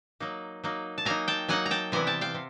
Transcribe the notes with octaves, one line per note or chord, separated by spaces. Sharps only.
F#3 A#3 D#4
F#3 A#3 D#4
A5
F#3 A#3 D#4 G#5 A#5
G5 A5
F#3 A#3 D#4 F#5 G#5
A#5
G5 A5
C3 E3 G3 B3 E4 G#5 A#5
G5 A5
F5 G5
C3